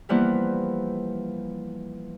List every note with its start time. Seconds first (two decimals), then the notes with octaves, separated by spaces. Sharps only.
0.09 E3 F3 G3 A#3 B3 E4